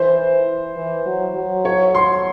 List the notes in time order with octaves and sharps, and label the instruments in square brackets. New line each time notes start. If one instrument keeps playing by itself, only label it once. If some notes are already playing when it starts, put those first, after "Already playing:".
Already playing: [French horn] E3 [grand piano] C5
[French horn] E3
F#3
F#3
[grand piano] C#5
C6